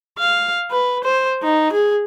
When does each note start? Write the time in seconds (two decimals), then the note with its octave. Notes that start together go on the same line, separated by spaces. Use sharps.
0.19 F5
0.71 B4
1.04 C5
1.43 D#4
1.73 G#4